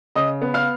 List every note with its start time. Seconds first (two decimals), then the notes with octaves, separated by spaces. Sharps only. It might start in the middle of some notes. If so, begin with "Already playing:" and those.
0.15 C#3 D#5 D#6
0.42 B3
0.54 F5 F6